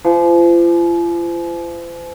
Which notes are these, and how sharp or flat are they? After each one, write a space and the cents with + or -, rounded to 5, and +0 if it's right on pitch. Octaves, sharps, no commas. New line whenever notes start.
F3 -40